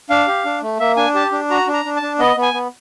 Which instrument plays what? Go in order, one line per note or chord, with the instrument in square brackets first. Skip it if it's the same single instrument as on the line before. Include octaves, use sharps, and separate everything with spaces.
[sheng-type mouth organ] D4 F5
G4
D4
A3
A#3 E5
D4 G#5
G4 A5
D4
F#4 A#5
D4
A#5
D4
A5
D4
B3 D#5
B3
G#5
B3